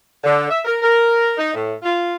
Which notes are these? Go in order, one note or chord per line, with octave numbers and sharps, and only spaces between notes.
D3
E5
A#4
A#4
D#4
A2
F4